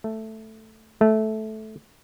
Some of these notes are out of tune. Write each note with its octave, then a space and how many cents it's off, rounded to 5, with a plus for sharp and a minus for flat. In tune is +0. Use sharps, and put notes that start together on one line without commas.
A3 +0
A3 -15